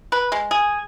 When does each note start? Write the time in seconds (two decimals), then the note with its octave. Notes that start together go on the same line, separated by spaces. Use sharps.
0.12 B4
0.32 G#3
0.51 G#4